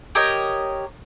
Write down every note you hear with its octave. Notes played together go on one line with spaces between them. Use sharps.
G4 A#4 C#5 D#5